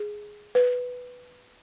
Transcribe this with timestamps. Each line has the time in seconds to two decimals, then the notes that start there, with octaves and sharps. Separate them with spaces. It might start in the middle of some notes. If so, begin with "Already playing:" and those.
Already playing: G#4
0.55 B4